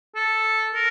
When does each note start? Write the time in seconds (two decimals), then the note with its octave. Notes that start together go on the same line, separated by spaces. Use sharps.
0.16 A4
0.75 A#4